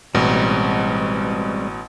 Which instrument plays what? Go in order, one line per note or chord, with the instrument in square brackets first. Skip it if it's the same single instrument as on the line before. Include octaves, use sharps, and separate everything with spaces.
[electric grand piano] A1 B2 [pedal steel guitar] G3 G#3 C4